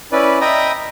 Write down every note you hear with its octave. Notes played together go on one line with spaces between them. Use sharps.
C#4 E4 B4 D5
D#5 E5 G5 A#5 B5 D#6